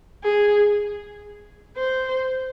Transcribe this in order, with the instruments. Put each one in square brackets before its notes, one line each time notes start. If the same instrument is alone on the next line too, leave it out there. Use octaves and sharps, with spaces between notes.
[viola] G#4
C5